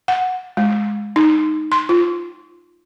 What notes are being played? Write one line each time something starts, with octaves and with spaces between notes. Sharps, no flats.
F#5
G#3
D#4
C6
F4